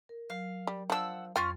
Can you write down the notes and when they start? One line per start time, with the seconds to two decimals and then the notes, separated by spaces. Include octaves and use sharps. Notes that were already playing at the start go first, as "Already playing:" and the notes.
0.09 A#4
0.30 F#3 F5
0.67 G3
0.90 F3 D4 F#5 E6
1.36 F2 C#4 F4 G5 F6